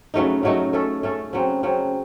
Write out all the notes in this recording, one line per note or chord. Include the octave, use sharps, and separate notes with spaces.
C#3 F#3 A3 D#4
C#3 F#3 A3 D#4
A3 C#4 A4
A3 C#4 A4
C#3 F#3 C4
C#3 F#3 C4